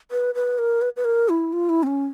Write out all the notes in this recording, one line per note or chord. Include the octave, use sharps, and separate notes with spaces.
B4
B4
A#4
B4
B4
A#4
E4
F4
E4
C4
C#4